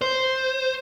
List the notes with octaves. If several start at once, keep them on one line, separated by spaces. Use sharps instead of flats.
C5